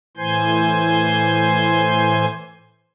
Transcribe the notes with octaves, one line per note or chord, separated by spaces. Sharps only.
A2 E3 C5 G#5 C6 G6